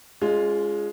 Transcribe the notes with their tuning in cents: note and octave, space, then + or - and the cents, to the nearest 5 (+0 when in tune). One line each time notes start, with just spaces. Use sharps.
G#3 +0 C#4 +45 F4 +0